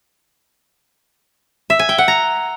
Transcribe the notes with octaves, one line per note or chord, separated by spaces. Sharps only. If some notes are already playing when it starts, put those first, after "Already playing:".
E5
G#5
G5
F#5
A#5